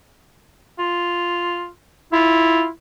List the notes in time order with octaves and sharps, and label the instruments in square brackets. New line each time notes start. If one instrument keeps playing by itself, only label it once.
[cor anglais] F4
[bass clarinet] E4 [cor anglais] F4